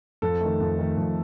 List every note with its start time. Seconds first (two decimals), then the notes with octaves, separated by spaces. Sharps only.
0.22 F2 A4
0.41 D#3 A3
0.60 F2
0.79 D#3 A3
0.97 F2